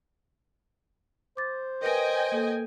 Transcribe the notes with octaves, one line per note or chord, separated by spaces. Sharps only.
C5 D6 A6
A#4 B4 D#5 G5 G#5 A#6
A#3 A4